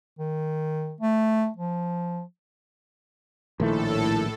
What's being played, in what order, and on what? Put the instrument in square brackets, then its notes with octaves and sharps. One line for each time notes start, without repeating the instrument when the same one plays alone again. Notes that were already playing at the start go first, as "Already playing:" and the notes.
[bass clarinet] D#3
A3
F3
[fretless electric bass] A#1 D#3 A3 [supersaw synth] A2 A4 [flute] E4